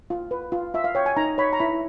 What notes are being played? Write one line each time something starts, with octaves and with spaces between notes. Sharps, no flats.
F4
B4
F4
F4 E5
F5
C#5 G5
G#5
D#4 A#5
C#5 B5
A#5
E4 B5